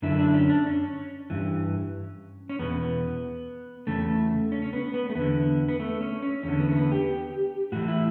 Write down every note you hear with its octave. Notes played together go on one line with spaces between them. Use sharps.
F#2 D3 E4
D4
C#4
D4
C#4
G2 E3
C#4
E2 B2 B3
E2 C#3 A3
C#4
C#4
B3
B3
A3
E2 D3 B3
B3
A3
C#4
C#4
E2 D3 C#4
B3
A3
B3
G4
A2 E3 F#4
E4